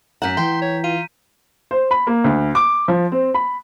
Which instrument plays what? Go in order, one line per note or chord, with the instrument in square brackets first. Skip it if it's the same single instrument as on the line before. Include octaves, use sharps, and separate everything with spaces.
[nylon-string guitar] F#2 F#5 [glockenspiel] A#5 G6 B6
[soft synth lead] E3 [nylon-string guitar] G5 [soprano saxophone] C6
[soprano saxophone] C#5
[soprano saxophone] F4 [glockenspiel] D#7
[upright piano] C5
B5
A#3
D2
D6
F3
C4
B5